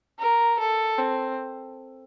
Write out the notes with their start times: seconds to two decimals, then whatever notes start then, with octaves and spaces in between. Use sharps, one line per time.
0.19 A#4
0.59 A4
0.98 C4